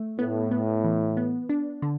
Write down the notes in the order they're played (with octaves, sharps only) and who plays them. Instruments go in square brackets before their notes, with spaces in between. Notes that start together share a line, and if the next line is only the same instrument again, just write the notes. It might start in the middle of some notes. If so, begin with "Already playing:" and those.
Already playing: [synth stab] A3
[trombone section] A2 [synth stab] B3
[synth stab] B3
E3
B3
D4
D3